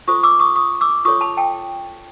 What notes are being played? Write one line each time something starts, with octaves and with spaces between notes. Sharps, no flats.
F4 A4 C5 C#6 D#6
D6 E6
C#6 D#6
C#6 D#6
D6 E6
F4 A4 C#5 C#6 D#6
A5 B5
G5 A5